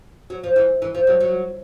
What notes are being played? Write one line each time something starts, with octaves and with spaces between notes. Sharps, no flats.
F#3
F3
E3
E3
F3
F#3
F#3